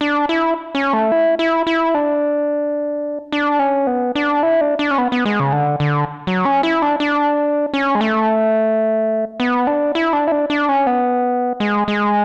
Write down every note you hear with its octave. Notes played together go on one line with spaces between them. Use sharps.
D4
E4
C#4
A3
E4
E4
E4
D4
D4
C#4
B3
D4
E4
D4
D4
C#4
B3
B3
G#3
C#3
D3
D3
F#3
C#4
E4
D4
D4
C#4
G#3
A3
B3
D4
E4
D4
E4
D4
D4
C#4
B3
G#3
G#3